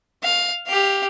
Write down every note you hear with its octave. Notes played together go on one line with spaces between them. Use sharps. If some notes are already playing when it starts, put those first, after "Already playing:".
F5
G4 F5